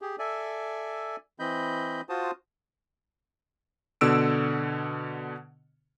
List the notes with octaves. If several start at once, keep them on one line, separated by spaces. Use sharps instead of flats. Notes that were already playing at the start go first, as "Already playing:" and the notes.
G4 G#4
A4 D5 E5 G#5
E3 C4 D#5 B5 G6
F4 F#4 C5 A5 D#6
B2 D3 E6 D7